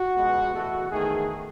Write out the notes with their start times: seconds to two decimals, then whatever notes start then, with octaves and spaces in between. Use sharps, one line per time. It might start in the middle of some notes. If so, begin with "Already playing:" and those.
Already playing: F#4
0.16 C#2 B2 G#3 B3
0.53 E2 B2 A3 F#4
0.91 E2 D#3 A3 G#4